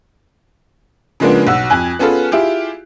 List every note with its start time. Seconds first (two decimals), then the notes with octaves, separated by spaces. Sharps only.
1.20 C#3 F3 G#3 A#3 B3 D4
1.47 B1 F#4 E6
1.70 F2 G#5 F#6
1.99 B3 C#4 F4 G#4 A4 B4
2.32 E4 F4 G4 G#4